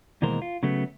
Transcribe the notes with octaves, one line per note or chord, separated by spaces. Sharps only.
D#2 B2 E3 G#3 A#4 C5
F4
C#3 F#3 A3 B3